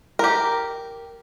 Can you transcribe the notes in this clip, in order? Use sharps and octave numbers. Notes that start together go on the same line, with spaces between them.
G4 A#4